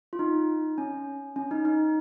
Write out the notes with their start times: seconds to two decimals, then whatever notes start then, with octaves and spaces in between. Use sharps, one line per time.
0.13 F4
0.19 D#4
0.78 C#4
1.36 C#4
1.51 D#4
1.65 D#4